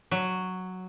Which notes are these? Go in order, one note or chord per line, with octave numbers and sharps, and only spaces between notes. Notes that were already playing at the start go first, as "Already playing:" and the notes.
F#3